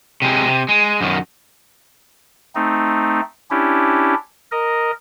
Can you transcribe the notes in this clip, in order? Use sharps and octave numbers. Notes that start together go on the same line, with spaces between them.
C3 G#3
C3
G#3
F#2 D#3
A3 C4 D#4
C#4 D4 E4 G4
A#4 D#5